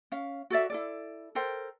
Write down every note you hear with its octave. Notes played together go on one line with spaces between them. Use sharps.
C#4 F5
F#4 A4 D5 E5
E4 A4 D5
A4 A#4 C5 G5